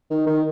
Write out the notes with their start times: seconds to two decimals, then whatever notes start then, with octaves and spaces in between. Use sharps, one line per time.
0.10 D#3
0.27 D#3